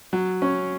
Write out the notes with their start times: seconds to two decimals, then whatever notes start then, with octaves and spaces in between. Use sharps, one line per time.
0.13 F#3
0.42 C#4